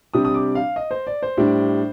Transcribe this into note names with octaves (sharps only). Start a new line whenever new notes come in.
C3 G3 D4 D#6
D#6
D6
F5
D#5
C5
D5
C5
A2 G3 D4